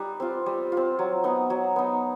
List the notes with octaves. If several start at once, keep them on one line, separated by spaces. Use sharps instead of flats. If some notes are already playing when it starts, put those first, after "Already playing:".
Already playing: G3 D#4 B4
C4 F4
G3
F4
C4
F#3
B3 D#4
F#3
B3 D#4